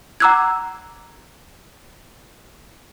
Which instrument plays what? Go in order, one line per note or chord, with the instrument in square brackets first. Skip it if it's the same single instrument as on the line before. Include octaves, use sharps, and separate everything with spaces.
[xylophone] F#5 A#5 D6 E6 F#6 G#6